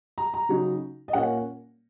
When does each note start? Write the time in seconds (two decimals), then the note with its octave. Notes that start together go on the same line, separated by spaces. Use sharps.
0.18 A#5
0.34 A#5
0.49 C#3 F#3 D#4
1.08 D#5
1.13 A#2 A#3 C#4 F#5